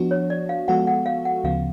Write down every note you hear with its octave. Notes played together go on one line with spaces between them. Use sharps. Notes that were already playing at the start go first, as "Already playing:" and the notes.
Already playing: F3 B3 D4 F#4
C#5
D5
F5
F3 G#3 B3 F#4 A4 F#5
F#5
F5
F#5
D2 C#3 F3 B3 F5